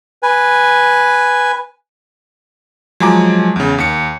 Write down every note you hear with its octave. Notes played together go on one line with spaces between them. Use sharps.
B4 G#5
F3 F#3 G#3 G#5 A#5 D6
E2 C#3
D#2 C#7